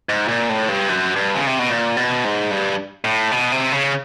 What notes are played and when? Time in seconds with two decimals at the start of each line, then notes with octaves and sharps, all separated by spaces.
0.09 G#2
0.28 A#2
0.49 A2
0.69 G2
0.89 F#2
1.16 G2
1.35 C#3
1.47 C3
1.59 B2
1.70 A#2
1.97 B2
2.24 G#2
2.51 G2
3.05 A2
3.31 B2
3.52 C3
3.72 C#3